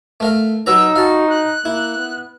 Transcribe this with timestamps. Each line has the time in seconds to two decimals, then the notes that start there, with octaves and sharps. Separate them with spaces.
0.20 A3 A#4 F5
0.66 F#3 D#4 B4 A#5 E6
0.96 F#4 F5 A5
1.29 F#6
1.65 A#3 E4
1.97 B3